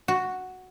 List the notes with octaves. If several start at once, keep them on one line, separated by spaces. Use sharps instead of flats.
F#4